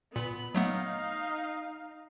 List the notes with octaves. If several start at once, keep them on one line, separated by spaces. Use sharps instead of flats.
A#2 B3 B5
F#3 A3 B3 D#4 F5